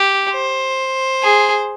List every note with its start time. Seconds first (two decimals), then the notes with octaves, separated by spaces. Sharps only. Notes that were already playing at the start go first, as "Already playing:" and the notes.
Already playing: G4
0.33 C5
1.23 G#4